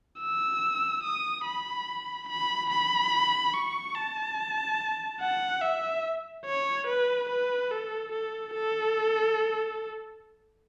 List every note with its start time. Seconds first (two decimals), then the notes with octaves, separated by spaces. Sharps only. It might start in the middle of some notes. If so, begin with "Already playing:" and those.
0.20 E6
1.03 D#6
1.45 B5
2.29 B5
2.70 B5
3.54 C#6
3.95 A5
5.20 F#5
5.62 E5
6.46 C#5
6.87 B4
7.29 B4
7.71 A4
8.12 A4
8.54 A4